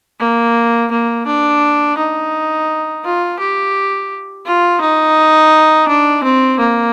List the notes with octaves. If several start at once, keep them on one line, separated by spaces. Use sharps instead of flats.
A#3
A#3
D4
D#4
F4
G4
F4
D#4
D4
C4
A#3